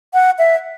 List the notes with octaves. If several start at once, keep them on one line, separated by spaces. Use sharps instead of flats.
F#5
E5